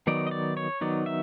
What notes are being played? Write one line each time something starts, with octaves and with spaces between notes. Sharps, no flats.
D#3 F#3 B3 D#4 D5
D#5
D5
C#5
D#3 F#3 B3 D#4 D5
E5